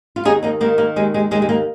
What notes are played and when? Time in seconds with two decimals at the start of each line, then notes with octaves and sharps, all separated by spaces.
0.16 F4
0.25 D#2 D#4 G#4
0.43 A#3 D#4
0.61 D#3 A#3
0.78 A#3
0.96 D#2 G#3
1.14 G#3
1.31 D#2 G#3
1.42 G#3
1.49 A#3